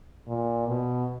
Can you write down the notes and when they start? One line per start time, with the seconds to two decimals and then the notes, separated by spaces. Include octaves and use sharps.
0.27 A#2
0.67 B2